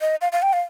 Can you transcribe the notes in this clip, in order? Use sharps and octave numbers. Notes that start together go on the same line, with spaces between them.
D#5
F5
F5
G5
F5